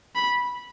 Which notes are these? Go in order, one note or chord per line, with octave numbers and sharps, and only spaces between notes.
B5